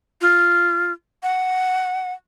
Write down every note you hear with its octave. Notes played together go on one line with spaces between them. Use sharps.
F4
F#5